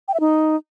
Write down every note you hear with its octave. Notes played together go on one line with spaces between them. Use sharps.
G5
E5
D#4